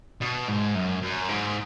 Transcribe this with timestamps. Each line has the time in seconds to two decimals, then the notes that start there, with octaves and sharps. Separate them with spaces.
0.21 B2
0.48 G#2
0.75 F#2
1.02 F#2
1.29 G#2